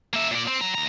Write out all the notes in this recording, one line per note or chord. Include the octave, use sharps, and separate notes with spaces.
A#3 E5
A#2 D5
C4
F#3 A#5
D#2 A#5